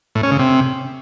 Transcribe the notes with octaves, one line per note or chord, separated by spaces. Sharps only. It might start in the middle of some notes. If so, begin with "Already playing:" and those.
A2
C#4
C#3
C3